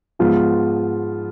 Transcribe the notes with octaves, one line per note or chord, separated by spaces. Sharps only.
G#2 F3 G#3 B3 F4